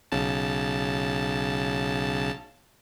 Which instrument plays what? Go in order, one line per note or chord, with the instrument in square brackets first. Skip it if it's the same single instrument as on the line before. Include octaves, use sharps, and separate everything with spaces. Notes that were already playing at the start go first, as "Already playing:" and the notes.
[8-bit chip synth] B1 C#3 A5